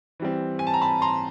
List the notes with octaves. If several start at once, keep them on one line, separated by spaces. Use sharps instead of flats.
E3 G3 C4
G#5
A5
A#5
A5 B5
A#5 C6